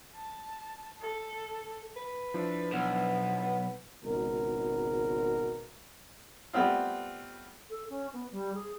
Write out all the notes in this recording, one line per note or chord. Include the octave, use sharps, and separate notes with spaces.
A5
A4
B4
F3 D4 E4
B1 B3
G#1 C#2 B2 A#4
G3 A3 B3 C4 F4
A4
C#4
B3
G3
G#4